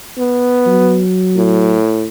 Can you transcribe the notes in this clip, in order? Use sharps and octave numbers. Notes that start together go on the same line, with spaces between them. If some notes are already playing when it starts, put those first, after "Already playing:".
B3
F#3
A2